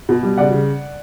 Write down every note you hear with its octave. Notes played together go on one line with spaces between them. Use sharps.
B2
G3
C#3 D5 F#5
C#3